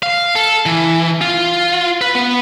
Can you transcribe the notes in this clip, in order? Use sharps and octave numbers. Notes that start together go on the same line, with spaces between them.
F5
A4
E3
F4
B4
B3